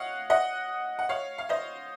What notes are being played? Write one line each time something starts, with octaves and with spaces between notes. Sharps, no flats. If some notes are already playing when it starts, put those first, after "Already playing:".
Already playing: C#5 D#5 F5 F#5
D#5 F#5
F#5
C#5 F5
F5
C5 D#5